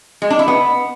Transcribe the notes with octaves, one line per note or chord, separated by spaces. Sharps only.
G#3
D4
E4
B3